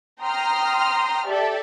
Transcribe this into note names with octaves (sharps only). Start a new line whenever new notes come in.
G5 A#5 C6 D#6 F6
G4 A4 D5 E5